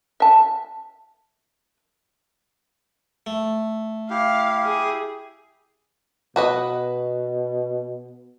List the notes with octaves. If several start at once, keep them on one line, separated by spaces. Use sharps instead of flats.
E5 A5
A3
E4 G4 F5
G#4
B2 F#4 B4 D#5